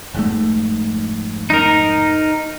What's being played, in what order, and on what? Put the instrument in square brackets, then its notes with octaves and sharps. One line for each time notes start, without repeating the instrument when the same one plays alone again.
[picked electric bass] F1 G#2 A3
[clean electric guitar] D#4 A#4